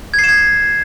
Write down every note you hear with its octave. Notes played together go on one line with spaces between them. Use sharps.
G#6
C7
E7
G#6